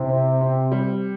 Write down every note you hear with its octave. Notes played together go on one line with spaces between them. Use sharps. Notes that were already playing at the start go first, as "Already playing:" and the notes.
Already playing: C3 E4
C4
C4
G3